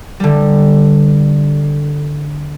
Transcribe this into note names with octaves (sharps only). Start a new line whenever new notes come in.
D3 G3